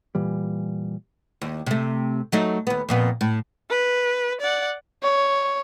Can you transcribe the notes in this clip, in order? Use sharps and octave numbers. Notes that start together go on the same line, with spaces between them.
A#2 E3 G3
D#2
C3 A3
F#3 A3 D#4
D#2 B3
F2 A#2 B3
A2
B4
D5 F#5
C#5